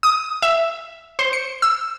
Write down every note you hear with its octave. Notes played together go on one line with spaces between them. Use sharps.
D#6
E5
C5
C#7
E6